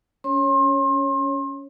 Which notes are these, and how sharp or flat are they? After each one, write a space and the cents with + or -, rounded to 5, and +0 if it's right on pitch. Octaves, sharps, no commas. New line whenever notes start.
C#4 +15 C#5 -20 C6 +35